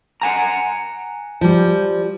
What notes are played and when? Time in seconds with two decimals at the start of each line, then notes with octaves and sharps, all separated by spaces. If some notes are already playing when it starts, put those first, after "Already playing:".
0.22 F#5 G#5 A#5
1.41 F3 G3